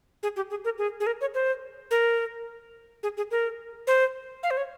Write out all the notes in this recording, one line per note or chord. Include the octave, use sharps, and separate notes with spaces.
G#4
G4
G#4
A#4
G#4
G#4
A#4
C#5
C5
A#4
G#4
G#4
A#4
C5
F5
C5
C#5